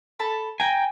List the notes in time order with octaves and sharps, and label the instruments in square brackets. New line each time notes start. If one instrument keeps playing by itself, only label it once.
[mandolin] A4 A5 B5
[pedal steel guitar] G5 G#5 [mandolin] A#5